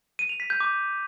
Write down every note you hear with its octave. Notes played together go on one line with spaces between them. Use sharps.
D#7
F7
B6
G6
D6